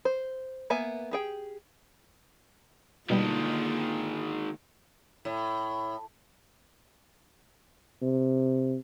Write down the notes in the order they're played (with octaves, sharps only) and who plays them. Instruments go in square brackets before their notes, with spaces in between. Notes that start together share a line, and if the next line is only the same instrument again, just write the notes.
[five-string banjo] C5
A#3 B3 E5 G#5
G4 G#4 G5
[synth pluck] B2 G3 [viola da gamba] D3 A#3 F4 [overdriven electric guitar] D#3 G#3
[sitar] A2
[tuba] C3